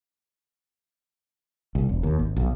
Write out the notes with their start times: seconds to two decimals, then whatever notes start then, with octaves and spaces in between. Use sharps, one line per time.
1.75 C2
1.89 E1
2.03 D#2
2.19 G#1
2.37 B1